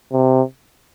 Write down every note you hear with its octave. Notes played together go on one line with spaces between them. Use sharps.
C3